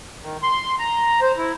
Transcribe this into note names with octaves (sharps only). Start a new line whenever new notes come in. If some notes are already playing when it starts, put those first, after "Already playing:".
D#3
C6
A#5
C5
E4